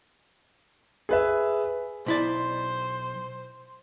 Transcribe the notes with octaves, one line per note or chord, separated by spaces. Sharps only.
G#4 B4 E5
B1 E4 C5 D5